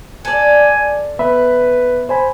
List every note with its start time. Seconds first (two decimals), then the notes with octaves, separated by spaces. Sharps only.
0.25 A4 D5 G#5
1.19 B3 B4 E5 B5
2.09 C5 G#5 B5